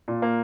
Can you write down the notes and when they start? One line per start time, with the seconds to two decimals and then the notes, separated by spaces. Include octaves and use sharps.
0.08 A#2
0.22 A#3